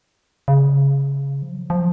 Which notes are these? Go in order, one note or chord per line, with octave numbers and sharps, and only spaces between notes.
C#3
F3
F#3
F3